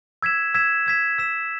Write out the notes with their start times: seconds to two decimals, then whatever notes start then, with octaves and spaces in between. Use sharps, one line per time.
0.22 E6 G#6 B6 E7
0.54 E6 G#6 B6 E7
0.86 E6 G#6 B6 E7
1.18 E6 G#6 B6 E7